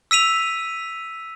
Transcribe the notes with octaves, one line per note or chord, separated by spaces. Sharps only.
E6 B6 D#7 F7